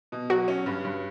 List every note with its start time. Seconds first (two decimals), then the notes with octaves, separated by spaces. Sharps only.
0.12 B2
0.30 F#3 F#4
0.48 C#4
0.66 G2
0.85 G2